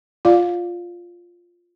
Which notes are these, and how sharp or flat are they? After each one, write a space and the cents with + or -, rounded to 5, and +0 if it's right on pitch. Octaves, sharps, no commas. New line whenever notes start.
F4 +0 D5 +0 F5 +15